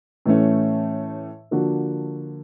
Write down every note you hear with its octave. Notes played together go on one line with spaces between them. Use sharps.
A2 E3 A3 C#4
D3 F3 A#3 D4 F#4